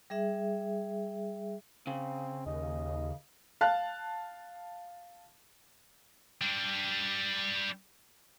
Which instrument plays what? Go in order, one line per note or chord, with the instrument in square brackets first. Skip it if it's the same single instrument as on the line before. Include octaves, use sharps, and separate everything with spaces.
[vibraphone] G3 G#4 E5
[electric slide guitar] C#3 [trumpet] C4
[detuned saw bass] D#2 [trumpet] D#5
[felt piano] F5 A5 F#6
[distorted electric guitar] G3 D4